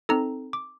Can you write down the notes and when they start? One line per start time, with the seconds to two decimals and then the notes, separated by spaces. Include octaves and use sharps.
0.09 C4 D#4 A4 A#5
0.53 D6